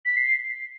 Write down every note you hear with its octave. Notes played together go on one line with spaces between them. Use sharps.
B6
C7